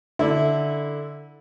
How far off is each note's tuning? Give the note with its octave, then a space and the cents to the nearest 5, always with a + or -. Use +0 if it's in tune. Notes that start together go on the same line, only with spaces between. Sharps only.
D3 +0 E4 -15